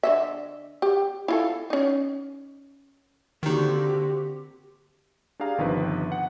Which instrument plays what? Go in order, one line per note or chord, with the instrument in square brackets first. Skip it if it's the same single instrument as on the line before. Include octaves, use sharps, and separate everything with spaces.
[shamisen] D3 D#5 E5
G4
E4 F4 A4
C#4 D#4
[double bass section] D3 [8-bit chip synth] D#3 D#4 [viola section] A#3 C4 F#4 [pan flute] G4
[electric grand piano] D4 G4 G#4 F5 A#5
G1 C3 D#3 F3 B4 F#6
F#5